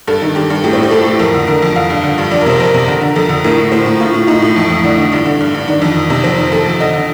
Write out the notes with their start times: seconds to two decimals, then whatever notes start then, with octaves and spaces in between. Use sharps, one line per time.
0.08 G2 A4
0.22 D#3
0.35 G2 G4
0.50 G2
0.64 A2 G4
0.73 C4
0.77 A2
0.83 G4
0.91 A2 A4
1.05 A2
1.19 F2 A#4
1.34 D3
1.47 D3 A#4
1.62 F2
1.76 D3 F5
1.90 G2
2.04 D3
2.18 G2
2.31 F2 D5
2.41 A#4
2.46 C3 C5
2.60 F2 A#4
2.74 C3
2.88 D3
3.01 D3
3.16 F2 A4
3.29 D3
3.44 A2 A#4
3.58 A2
3.72 A2 C5
3.86 A2
4.00 A2 F4
4.14 A2
4.27 A2 D#4
4.42 A2
4.56 F2
4.70 F2
4.83 D3 D4
4.98 D3
5.11 G2 D4
5.26 D3
5.41 G2
5.55 G2
5.68 D#3 D4
5.82 F2
5.96 D#3
6.10 C3
6.24 F2 C4
6.38 D#3
6.52 F2 A4
6.66 F2
6.80 D3 D#5
6.93 D3